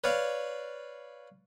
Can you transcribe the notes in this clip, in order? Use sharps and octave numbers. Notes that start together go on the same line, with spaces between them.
B4 C#5 D5 F5